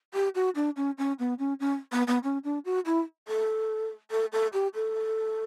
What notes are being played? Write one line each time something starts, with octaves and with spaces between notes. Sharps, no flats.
G4
F#4
D4
C#4
C#4
B3
C#4
C#4
B3
B3
C#4
D4
F#4
E4
A4
A4
A4
G4
A4